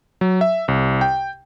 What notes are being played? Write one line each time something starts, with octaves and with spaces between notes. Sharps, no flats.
F#3
E5
C2
G5